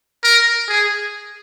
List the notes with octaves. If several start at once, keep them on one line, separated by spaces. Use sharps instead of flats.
A#4
G#4